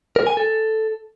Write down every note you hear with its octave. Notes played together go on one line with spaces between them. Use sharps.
A#4
G#5
A4